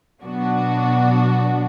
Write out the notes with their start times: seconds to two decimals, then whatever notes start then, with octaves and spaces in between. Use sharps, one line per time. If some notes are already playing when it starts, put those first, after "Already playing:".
0.21 B2 F#3 B3 D4 F#4